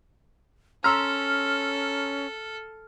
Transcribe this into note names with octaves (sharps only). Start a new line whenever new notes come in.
C#4 A4 A#5 C6 E6 F6